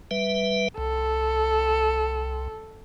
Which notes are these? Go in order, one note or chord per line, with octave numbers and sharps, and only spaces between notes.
G3 B4 E5
C2 A4